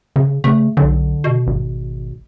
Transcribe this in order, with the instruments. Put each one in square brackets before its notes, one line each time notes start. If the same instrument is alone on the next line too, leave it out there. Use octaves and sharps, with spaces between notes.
[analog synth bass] C#3
[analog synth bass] C#3 [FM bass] A3
[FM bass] B1 [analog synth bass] D3
[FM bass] B2
[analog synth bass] G#1